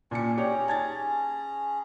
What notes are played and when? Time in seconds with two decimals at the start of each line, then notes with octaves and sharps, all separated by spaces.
0.11 A#2 C#4 D4 G4 C#7
0.37 C#4 G4 G#4 C#5 D5 A#5
0.68 A5 G#6 A6